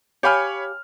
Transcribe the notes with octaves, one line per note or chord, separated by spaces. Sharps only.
G4 C#5 F5 G#5 B5 F6